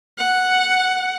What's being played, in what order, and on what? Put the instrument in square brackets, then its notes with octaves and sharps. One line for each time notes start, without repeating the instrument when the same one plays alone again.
[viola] F#5